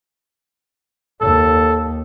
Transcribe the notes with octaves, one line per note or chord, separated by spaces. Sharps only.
D#2 A4